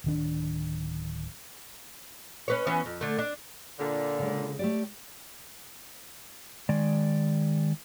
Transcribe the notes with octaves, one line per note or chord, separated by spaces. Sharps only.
D1 D#3 D4
C#4 B4 C#5
E3 B3 C#4
F2
D3 A3
D4
A#2 D3
C#3 G#3
A3 G4 D5
D#3 G#3 D5